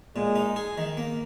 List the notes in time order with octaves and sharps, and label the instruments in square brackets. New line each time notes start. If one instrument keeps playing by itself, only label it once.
[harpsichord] A#2 [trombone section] G#3
[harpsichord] D#4
G#4
D#3
A#3